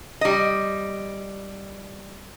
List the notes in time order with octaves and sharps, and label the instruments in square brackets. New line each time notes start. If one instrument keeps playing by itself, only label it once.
[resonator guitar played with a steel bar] G3 D#5